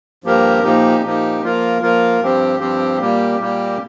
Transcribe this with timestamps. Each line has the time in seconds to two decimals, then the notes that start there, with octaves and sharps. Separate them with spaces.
0.24 G2 F3 A#3 G4 A#4
0.63 A#2 F3 A#3 D#4 G4
1.03 A#2 F3 A#3 D#4 G4
1.42 F3 A#3 F4 A#4
1.81 F3 A#3 F4 A#4
2.21 G2 F3 C4 G4
2.60 G2 F3 C4 G4
3.00 A#2 G3 A#3 G4
3.39 A#2 G3 A#3 G4